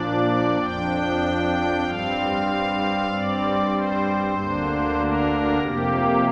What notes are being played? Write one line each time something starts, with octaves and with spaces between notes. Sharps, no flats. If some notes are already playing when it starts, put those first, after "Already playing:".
Already playing: A#2 F3 D4 D5
F2 F3 D4 G5
G2 G3 C4 F5
G2 G3 C4 D5
C5
D2 D3 A#3 D4
A#4
F2 C3 A#3 G4